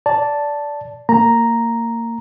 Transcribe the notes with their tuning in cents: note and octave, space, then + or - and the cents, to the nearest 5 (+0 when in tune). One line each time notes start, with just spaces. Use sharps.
D5 -15 A5 +0
A#3 -25 A#5 +0